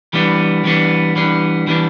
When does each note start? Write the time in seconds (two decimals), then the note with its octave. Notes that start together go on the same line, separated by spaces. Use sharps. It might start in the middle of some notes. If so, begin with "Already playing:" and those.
0.13 E3 G3 B3 D4
0.64 E3 G3 B3 D4
1.16 E3 G3 B3 D4
1.67 E3 G3 B3 D4